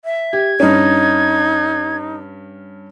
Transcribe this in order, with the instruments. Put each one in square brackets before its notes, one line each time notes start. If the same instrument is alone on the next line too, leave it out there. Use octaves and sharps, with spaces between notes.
[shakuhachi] E5
[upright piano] G4 [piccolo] G#6
[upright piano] G2 C#4 [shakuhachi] D#4